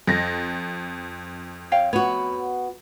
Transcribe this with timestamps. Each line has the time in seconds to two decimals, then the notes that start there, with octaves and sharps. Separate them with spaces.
0.07 F2 A#6
1.72 C#5 F5 G5
1.93 B3 F#4 C#5